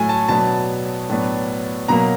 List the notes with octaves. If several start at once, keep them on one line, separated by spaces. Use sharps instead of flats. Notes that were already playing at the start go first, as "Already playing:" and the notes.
Already playing: A2 F#3 A3 G#5
A5
B2 F#3 B3 D4 A5
A2 F#3 B3 D4
B2 F#3 A#3 A#5